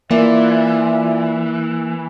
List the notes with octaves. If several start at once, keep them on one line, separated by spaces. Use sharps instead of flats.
E3 A#3 F4 D5 E5